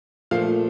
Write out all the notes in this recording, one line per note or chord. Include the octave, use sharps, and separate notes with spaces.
A#2 F3 A3 F5